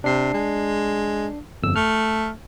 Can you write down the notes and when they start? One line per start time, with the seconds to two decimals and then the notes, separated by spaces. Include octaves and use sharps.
0.04 C3 D4 C7
0.34 G#3
1.63 G1 F2 E6
1.76 A3 F6